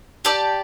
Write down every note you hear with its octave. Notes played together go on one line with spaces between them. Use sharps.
G4 D5 A5